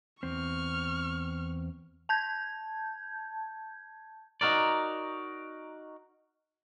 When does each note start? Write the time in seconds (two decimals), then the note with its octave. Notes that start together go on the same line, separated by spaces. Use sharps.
0.23 E2 C4 C#6 F6
2.09 A5 G6 G#6
4.41 D#4 F#4 A#4 D5